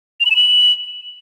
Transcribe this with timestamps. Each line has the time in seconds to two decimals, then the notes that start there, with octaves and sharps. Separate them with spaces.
0.20 F7
0.25 F#7
0.31 E7
0.36 F#7